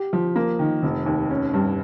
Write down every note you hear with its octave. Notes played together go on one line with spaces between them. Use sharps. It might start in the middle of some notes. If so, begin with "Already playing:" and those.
Already playing: G4
F3
A#3
D#3
F1
D#2
C#4
G2